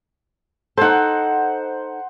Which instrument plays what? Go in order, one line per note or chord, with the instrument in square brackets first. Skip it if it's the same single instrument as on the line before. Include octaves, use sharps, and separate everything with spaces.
[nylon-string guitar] D#4 A4 [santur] C5 F#5